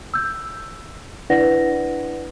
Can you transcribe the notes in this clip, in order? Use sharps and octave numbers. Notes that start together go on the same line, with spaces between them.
E6 G6
D4 E4 B4 D5 F#5 A#6